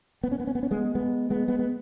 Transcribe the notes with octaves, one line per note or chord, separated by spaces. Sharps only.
B3
C#4
B3
C#4
B3
C#4
G#3 B3
G#3 B3
G#3 B3
G#3 B3
B3